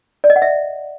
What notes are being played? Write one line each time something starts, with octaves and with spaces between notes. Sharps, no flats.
D5
D#5
F#5
E5